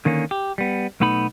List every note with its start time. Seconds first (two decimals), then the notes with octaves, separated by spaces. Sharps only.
0.05 D3 D#3 A#3 C#4
0.31 G4
0.58 G3 B3
1.00 B1 A3 B3 D#4 B5